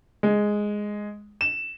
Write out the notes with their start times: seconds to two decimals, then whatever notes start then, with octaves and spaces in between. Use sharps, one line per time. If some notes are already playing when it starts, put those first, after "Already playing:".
0.23 G#3
1.41 E7